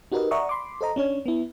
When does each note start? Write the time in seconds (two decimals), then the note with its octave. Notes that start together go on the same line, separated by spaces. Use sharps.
0.12 D#4 F#4 G4 A#4 B4 D#5
0.31 D5 E5 F#5 A#5 C#6 D#6
0.49 B5 C6 D6
0.81 A4 C5 D#5 A#5
0.96 C#4 D4 C#5
1.26 B3 E4